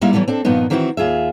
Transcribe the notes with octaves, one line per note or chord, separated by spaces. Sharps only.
G3 G#3 A#3 D#4 E4 E5
E3 F#3 G3 A3 B3
C4 D4 A4
G2 A#2 D#3 F3 B3 D#4
D#3 E3 C4 D#4 E4 F#4
D#2 F4 G#4 E5